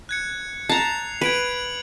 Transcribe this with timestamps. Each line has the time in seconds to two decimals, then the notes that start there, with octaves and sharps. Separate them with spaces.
0.09 F#6 G#6 C#7
0.69 A5 A#5 C7 F7
1.21 B4 G#6 D7 F#7